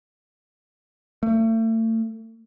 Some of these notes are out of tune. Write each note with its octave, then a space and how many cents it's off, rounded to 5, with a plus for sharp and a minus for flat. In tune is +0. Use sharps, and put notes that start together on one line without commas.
A3 +35